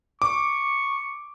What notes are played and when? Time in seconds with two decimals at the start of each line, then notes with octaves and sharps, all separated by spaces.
0.22 C#6 D6